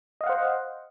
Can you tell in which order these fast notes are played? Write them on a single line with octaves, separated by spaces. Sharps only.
D#5 F5 F#5 C5